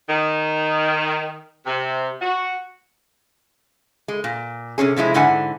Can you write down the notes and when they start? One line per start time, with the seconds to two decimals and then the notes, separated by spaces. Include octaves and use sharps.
0.09 D#3
1.66 C3
2.21 F#4
4.08 G#3
4.24 A#2
4.78 C3 D#3 C#4 G#4
4.96 C3 F3 G#3 E4
5.14 G#2 D3 E4 F#5 G#5